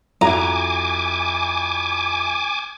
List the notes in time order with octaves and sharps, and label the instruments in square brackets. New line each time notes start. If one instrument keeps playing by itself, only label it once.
[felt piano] F2 E4 F#4 [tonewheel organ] G#5 D6 [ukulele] A#5